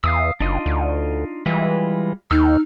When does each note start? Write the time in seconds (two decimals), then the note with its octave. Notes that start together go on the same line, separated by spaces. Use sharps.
0.04 E2 F5 D#6 E6
0.40 F#1 D4 D#4 F4
0.66 D2
1.46 E3 G3 G#3 F4
2.31 D#2 D#4 E6 F6 G6